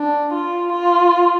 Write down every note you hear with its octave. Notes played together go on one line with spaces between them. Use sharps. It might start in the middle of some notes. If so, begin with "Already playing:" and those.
Already playing: D4
F4
F4